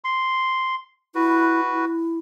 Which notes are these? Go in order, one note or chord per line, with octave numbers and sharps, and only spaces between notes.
C6
E4 F#4 B4
E4